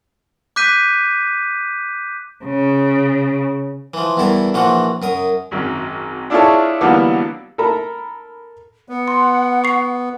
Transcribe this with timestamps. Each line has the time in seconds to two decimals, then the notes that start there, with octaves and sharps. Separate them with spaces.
0.56 D6 F#6 G6 B6 D#7
2.44 C#3
3.94 E3 F3
4.17 E2 G2 E4 A4 A#4
4.54 A#1 E3 F3 F#4
5.02 F#2 A#4 D#6
5.51 G#1 F#2
6.30 D4 E4 F4 G#4 A4 C#5
6.81 D3 E3 F#3 G3 A#3 B3
7.58 A4 A#4 A#5 B5
8.89 B3 F#5
9.08 C6
9.64 C#6 C7